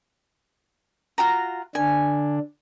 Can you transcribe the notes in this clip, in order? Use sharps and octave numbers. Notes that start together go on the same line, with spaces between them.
F4 F#4 A#5
D3 D4 G#5